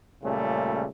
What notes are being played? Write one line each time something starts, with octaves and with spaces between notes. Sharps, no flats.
C#2 A#2 C#3 G3 A3